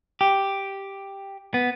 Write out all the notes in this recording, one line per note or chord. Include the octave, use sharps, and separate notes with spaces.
G4
B3